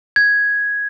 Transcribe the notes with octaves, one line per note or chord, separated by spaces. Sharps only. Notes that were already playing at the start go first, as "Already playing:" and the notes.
G#6